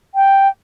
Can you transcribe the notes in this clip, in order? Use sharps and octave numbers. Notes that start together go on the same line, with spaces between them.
G5